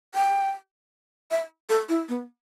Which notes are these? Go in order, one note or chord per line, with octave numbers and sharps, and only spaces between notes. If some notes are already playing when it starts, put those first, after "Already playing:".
G5
E5
A4
E4
B3